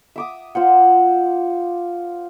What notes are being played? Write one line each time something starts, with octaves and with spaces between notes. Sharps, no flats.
E5 D6 D#6
F4 C5 F#5